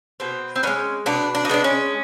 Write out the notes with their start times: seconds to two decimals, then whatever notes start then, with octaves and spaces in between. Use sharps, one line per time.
0.20 B2 C4
0.56 C4
0.63 G#3 B3 C#4
1.06 B2 D4
1.35 D4
1.45 D#4
1.49 G#3 B3 D4
1.64 C#4